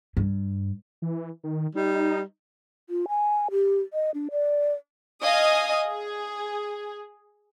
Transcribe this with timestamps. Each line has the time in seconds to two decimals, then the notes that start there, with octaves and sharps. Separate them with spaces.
0.17 G2
1.02 E3
1.44 D#3
1.75 G3 D#4
2.90 F4
3.08 G#5
3.51 G4
3.93 D#5
4.14 D4
4.31 D5
5.23 D#5 F5 G#5 D#6
5.88 G#4